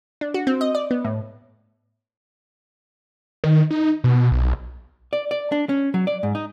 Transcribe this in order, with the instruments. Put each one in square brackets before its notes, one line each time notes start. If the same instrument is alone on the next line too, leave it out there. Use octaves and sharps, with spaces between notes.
[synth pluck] D4
F#4
C4
D#5
D5
B3
A2
[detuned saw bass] D#3
D#4
B2
B1
[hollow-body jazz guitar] D5
D5
D4
C#4
F#3
D5
G#2
D#4